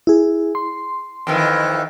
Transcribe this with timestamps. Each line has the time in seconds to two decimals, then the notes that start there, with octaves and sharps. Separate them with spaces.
0.07 E4 G#4
0.55 C6
1.27 F2 D#3 E3